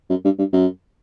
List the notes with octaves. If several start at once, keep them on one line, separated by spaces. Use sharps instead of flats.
F#2
G2
G2
F#2